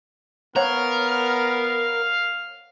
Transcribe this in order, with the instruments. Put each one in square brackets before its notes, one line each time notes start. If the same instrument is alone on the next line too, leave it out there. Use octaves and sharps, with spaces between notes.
[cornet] B3 [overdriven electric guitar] A#4 [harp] C#5 F#5 [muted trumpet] F5